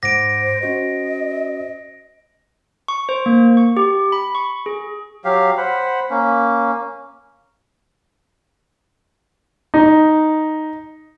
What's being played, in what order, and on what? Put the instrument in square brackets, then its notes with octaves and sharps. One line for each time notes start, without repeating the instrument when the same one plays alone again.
[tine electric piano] G#2 F#5 D6 [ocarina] C5 [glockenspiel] A#6 D7
[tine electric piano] C#4 F#4 C5 [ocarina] D#5
[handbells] C#6
C5
A#3
C#6
G4
B5
C#6
G#4
[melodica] F#3 G4 F5
C5 F#5 B5
A#3 C#4
[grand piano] D#4